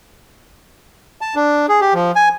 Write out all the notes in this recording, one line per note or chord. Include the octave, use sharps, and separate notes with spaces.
A5
D4
G#4
G4
F3
G#5